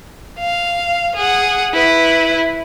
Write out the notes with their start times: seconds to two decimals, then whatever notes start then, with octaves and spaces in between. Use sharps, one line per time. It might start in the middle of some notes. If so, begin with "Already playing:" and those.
0.39 F5
1.16 G#4 F#5
1.74 E4 B4